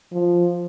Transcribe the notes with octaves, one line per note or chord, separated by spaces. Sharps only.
F3